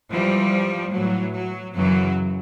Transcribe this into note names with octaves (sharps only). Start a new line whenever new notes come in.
G#2 E3 F3 G3
A2 E3 F#3
F#3
F#2 C#3 E3 F#3